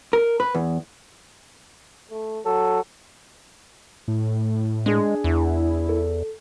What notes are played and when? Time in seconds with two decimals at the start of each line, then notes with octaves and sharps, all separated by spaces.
0.13 A#4
0.40 B4
0.55 E2
2.11 A3
2.45 F#3 A4
4.08 A2
4.86 G#3 D4 G#4
5.24 E2 E4
5.89 A4